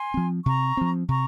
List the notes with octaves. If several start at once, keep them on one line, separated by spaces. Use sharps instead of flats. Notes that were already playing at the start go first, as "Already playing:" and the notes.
Already playing: G#5 C6
F3 C4
C3 A#5 C#6
F3 C4
C3 A#5 C#6